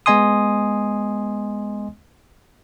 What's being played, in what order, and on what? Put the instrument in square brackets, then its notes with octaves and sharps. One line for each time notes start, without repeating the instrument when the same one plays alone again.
[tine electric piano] G#3 B3 D#5 G#5 C6 D#6